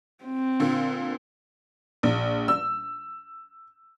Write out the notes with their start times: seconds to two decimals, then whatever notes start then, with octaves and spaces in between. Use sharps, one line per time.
0.24 C4
0.60 A#2 D3
2.03 A#1
2.48 E6